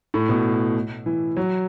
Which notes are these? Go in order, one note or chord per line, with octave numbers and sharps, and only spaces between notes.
A2
B2
E3
F#3